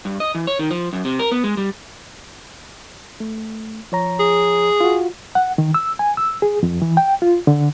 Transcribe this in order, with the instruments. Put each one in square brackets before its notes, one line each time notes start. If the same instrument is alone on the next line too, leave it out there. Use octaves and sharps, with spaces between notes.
[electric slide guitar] G2
D#5
E3
C#5
D#3
F3
F#2
C3
A#4
B3
G#3
G3
[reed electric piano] A3
F3 C#5 A#5
[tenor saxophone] G#4
[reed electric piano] F4 F#4
F#5
D#3
E6
G#5
E6
G#4
F2
E3
G5
F4
D3